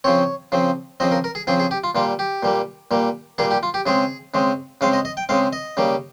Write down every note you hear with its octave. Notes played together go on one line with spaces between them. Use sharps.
C#3 F3 C4 C#5
C#3 F3 C4
C#3 F3 C4 D#5
A#4
A#4
G#4
C#3 F3 C4 G#4
G#4
G4
F4
A#2 G3 A#3 F4
G4
A#2 G3 A#3
A#2 G3 A#3
A#2 G3 A#3 G#4
G4
F4
G4
C#3 G#3 C4 G#4
C#3 G#3 C4
C#3 G#3 C4 F5
D#5
D#5
G5
C#3 G#3 C4 F5
D#5
C#3 G3 A#3